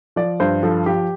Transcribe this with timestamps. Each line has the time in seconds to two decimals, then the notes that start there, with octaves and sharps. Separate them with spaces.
0.16 F3 D5
0.40 G2 C5
0.63 F3 A4
0.86 F3 G4